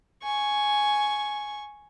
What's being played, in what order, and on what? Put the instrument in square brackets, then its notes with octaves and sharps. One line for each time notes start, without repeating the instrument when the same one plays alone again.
[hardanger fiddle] G#5 C#6